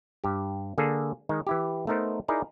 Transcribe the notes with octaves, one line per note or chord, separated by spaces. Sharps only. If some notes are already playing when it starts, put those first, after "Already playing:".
G2 G4
D3 A#3 G#4 A4
D#3 G#3 D#4
E3 E4 G4
A3 B3 D#4 A#4 C5
D#4 E4 G#4 A#4 D5